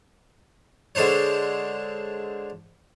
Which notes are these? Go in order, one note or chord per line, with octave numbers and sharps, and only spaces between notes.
D3 G#3 D4 C5 C#5